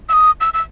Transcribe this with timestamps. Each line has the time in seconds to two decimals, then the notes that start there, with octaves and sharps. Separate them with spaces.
0.09 E6
0.13 D#6
0.41 E6
0.54 E6